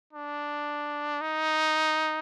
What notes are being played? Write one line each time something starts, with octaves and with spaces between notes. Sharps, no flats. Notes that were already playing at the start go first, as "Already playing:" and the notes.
D4
D#4